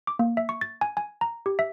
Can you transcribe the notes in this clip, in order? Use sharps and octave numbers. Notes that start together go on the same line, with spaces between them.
D6
A#3
E5
C#6
A6
G#5
G#5
A#5
G4
E5